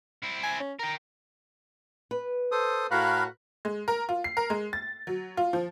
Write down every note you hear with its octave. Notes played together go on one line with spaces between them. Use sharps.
C4 E4
G#5
C#4
A#4 G5 A#5
B4
A4 C5 D#6
A2 F#4 A#4 F5 B5 F#6
G#3
A#4
F4
C7
A#4
G#3
A6
F#3
F4
F3